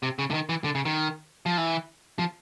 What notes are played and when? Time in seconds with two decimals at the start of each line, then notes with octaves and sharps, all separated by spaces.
0.03 C3
0.19 C#3
0.30 D3
0.34 D#3
0.49 E3
0.64 D3
0.75 C#3
0.85 D#3
1.46 F3
1.57 E3
2.19 F3